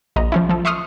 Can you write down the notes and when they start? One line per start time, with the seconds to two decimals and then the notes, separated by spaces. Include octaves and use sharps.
0.16 A#1 D#5 A#5
0.32 F3 C#4 E4
0.49 F3 A4
0.65 E5 C6 C#6 D#6 F6